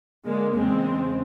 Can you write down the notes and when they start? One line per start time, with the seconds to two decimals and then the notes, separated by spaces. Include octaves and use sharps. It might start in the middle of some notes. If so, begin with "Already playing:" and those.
0.25 D3 G#3 A#3
0.55 E2 C#3 G#3 C4